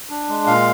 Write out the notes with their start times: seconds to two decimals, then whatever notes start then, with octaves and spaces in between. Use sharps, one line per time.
0.10 D4
0.29 G#3
0.46 A#2 F5